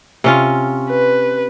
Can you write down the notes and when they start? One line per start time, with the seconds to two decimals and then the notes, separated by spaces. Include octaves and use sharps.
0.24 C3 C#4 F4
0.90 B4